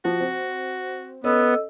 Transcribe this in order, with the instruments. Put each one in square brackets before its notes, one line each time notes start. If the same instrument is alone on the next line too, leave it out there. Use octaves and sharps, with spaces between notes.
[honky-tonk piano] F3 [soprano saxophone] F#4
[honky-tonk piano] C4
[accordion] B3 [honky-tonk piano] C#4 [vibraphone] A4 D#5 E6